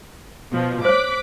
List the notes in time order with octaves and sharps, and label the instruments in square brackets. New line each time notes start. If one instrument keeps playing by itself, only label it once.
[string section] B2 F3
[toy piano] C5 C#5 [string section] D6 F#6 B6